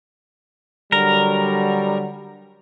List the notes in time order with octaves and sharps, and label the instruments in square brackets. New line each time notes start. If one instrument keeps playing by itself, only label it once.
[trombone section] D3 F#3 G3 [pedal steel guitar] A#4